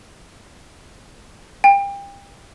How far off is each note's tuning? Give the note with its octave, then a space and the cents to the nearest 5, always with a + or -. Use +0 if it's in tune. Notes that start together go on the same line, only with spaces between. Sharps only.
G5 +30